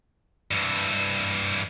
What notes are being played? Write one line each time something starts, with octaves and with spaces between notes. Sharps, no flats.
G2 E3